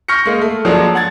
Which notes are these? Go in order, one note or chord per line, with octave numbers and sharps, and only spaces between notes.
C#6 F6 G6 A#6 C#7
G#3 A#3
A3
F3 F#3 G#3 A#3 D4
F#5 G#6 A6